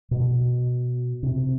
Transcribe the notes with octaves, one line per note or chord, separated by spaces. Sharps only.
B2
C3